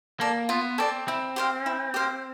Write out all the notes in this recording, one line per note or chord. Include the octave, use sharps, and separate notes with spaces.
A#3 A4 D5
B3 F4
C4 A4 D5
C4 E4
G4 C5 F5
E4
G4 C5 F5